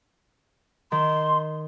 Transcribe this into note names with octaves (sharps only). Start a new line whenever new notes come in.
D#3 C6